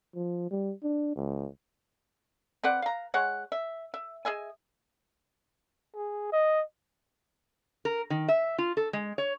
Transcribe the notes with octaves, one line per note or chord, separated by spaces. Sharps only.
F3
G3
D4
C#2
C4 B4 D5 F#5
F5 A#5
G#3 C#5 F#5
E5
E5
G#4 D#5 E5 G#5
G#4
D#5
A#4
D#3
E5
F4
A4
G#3
C#5